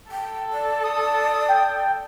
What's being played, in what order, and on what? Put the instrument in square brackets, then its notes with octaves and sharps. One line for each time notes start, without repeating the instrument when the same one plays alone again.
[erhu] A4 [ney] G5
[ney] D5
[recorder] D#6
[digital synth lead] G5